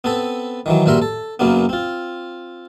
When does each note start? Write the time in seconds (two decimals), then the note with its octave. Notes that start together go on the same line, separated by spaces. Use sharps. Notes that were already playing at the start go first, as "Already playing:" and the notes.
0.04 B3 C4 A4 B4
0.66 D#3 E3 F#3
0.86 A#1 G2 F#4 A#4 E5 C6
1.02 A4
1.39 F#2 C#3 F#3 A#3 B3
1.69 C4 F4